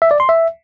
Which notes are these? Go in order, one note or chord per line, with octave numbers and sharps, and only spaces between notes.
E5
D5
C6
E5